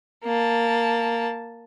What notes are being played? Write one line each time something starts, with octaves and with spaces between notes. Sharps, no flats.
A#3 A5